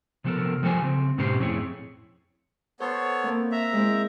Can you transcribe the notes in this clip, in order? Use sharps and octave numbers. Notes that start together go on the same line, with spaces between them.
C3 F3 B3 G4 A4 A#4
F3 G3 A4 C5 G#5
C#3 C4
G#2 B2 C#4 G4 C5
F2 A2 C4 E4 G#4 C#5
B3 A4 C5 C#5
A#3 C4
E5 A#5 F#6
G#3 C4 E4